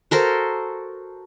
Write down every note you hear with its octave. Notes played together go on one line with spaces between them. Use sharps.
F#4 A4 A#4 C5